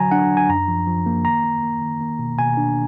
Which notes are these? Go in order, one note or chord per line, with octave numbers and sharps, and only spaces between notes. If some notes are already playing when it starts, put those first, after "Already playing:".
Already playing: D3 F#3 G#5 A#5
D4 F#5
D4
G#5
F#2 A#5
F3
F3
A#3
D#3 A#5
A#3
A#3
D#3
A#3
B2
B2 G#5
D4